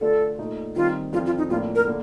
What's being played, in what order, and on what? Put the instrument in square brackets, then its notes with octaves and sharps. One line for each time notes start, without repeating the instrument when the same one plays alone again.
[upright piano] D3 A3 D4 F4 [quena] A4
[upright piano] A#2 A3 D#4
[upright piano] D#3 G3 C4 D#4 [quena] F4
[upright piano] F2 D3 F3 C4 [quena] F4
[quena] F4
D#4
[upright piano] A2 F3 A#3 D4 [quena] F4
[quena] A#4
[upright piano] D3 A#3